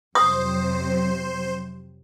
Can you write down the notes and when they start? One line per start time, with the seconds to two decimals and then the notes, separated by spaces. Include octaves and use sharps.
0.15 F2 C3 F#3 C5 D#6